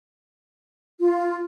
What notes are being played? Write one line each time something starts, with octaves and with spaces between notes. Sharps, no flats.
F4